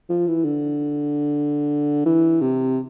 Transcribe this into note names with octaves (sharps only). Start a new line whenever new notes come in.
F3
E3
D3
E3
C3